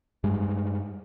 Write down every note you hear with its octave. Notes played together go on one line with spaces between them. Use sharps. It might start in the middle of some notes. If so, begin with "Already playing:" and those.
G2 G3 G#3